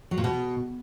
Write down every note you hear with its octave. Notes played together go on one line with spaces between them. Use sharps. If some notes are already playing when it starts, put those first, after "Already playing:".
F#3
A#2
B2